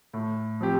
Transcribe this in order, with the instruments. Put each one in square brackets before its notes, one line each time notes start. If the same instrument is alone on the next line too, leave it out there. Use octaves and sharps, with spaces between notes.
[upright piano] A2
F3 C4 G4